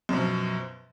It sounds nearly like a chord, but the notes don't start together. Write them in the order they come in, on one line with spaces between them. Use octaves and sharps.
F#2 B2 F3